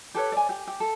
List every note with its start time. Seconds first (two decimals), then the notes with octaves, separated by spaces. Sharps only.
0.14 G4 A4 B4 C#5
0.32 D5 G#5
0.49 G4
0.67 G4
0.80 A4